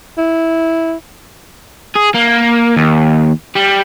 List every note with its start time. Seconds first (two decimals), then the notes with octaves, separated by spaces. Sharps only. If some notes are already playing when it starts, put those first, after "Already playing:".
0.18 E4
1.96 G#4
2.15 A#3
2.76 D#2
3.55 G3